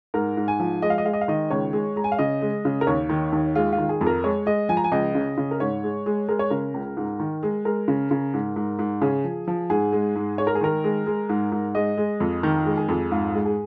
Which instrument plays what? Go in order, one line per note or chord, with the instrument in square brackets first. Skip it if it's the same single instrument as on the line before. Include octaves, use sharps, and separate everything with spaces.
[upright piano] G#2 A#4
G#2
G#5
F3
G#3 D#5
F5
D#5
G#3 F5
D#5
F5
D#3 D#5
C#2 C#5
G#3
G#3 A#5
G#5
F5
C#3 D#5
G#3
C#3
A#4
D#2 C#5
D#3
D#2
G#3 F4
F4
D#3
G#4
F2
A#4
G#3 C#5
G#3 D#5
F3 G#5
A#5
G#5
C#2 D#5
C#3
C#3
A#4
G#2 C#5
G#3
G#3
G#3 A#4
C#5
C#3 A#4
C#2
G#2
D#3
G#3
G#3 A#4
C#3
C#3
G#2
G#2
G#2
C#3 G#4
F3
F3
G#2 G#4
G#3
G#2
G#3 C#5
A#4
G#4
D#3 A#4
G#3
G#3
G#2
G#2
G#3 D#5
G#3
F2
D#3 A#4
G#3
G#4
F2
G#2 F4
G#3
G#4